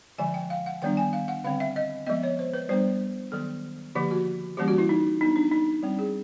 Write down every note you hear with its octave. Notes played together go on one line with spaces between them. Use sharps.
D3 F3 G#3 G#5
G5
F5
F#5
D#3 G3 B3 D4 G5
G#5
F5
F#5
D3 G3 C4 F5
E5
D#5
F3 G#3 B3 D#5
C#5
C5
B4
G3 B3 D4 C5
D#3 F#3 B3 A4
D3 F3 A#3 G4
F#4
E3 G3 A#3 C#4 G4
F#4
E4
D#4
F#3 B3 D4 D#4
D4
D#4
G3 C4
G#4